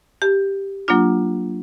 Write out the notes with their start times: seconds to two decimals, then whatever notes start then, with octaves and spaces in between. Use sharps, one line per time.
0.22 G4
0.88 F#3 A#3 D4 F4